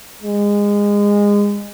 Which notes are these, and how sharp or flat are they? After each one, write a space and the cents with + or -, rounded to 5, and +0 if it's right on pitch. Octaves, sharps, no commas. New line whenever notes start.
G#3 -25